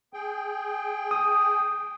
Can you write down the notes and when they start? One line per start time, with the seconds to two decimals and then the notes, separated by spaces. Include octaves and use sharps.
0.13 G#4 G5
1.11 D#6